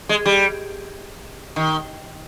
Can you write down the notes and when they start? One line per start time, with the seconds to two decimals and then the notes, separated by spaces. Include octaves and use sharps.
0.09 G#3
0.26 G3
1.56 D#3